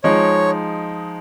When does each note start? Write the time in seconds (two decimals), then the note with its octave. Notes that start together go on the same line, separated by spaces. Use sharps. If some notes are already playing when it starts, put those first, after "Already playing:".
0.04 F3 G#3 D#4 C#5